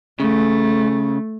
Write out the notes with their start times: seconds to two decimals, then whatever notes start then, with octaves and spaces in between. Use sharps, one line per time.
0.20 C#3 A3